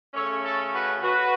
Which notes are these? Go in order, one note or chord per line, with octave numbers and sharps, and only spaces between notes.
C#3 A3 C#4 A4 C#5
A4
F#4 B4
F#4 B4